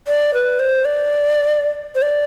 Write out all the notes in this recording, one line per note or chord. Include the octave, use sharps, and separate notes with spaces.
D5
B4
C5
D5
C5
D5